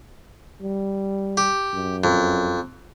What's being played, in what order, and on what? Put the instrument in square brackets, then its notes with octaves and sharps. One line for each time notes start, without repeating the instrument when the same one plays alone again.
[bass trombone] G3
[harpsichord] G4
[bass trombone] F#2
[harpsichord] F2